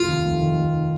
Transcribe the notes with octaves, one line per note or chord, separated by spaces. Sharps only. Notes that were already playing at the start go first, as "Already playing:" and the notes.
Already playing: F1 F4
D#2
F1
D#3
F1